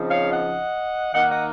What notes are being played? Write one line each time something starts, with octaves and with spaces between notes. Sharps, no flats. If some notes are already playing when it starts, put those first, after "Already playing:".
Already playing: C#3 F3 C4 D#4
C#5 F5
D#5 F#5
D#3 A#3 D#4 D#5 F#5
D#5 F#5